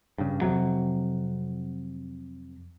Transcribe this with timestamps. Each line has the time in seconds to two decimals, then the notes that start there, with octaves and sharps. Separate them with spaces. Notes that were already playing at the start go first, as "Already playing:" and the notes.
0.18 G2 C#3
0.41 F2 C3 F#3